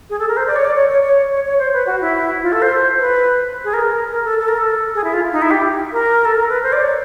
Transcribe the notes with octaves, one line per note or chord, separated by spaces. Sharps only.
G#4
A4
A#4
C5
D5
C#5
D5
C#5
C#5
C#5
C#5
C#5
C5
B4
F#4
E4
F4
A4
C5
B4
G#4
A#4
A#4
A4
A4
A#4
A4
G#4
E4
F4
D#4
E4
G4
A#4
A4
A#4
B4
C5
D5
C#5